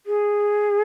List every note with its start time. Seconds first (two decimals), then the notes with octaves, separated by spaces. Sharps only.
0.06 G#4